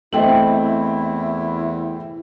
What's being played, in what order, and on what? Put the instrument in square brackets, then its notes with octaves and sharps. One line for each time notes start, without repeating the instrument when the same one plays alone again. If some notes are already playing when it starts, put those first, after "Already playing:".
[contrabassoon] E2 [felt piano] A3 C4 [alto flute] E4 [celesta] D#5 G5 F#7